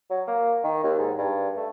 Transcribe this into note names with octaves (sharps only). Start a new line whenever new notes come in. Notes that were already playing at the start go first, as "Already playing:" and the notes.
F#3
A#3
D#3
D#2
G#2
G2
A3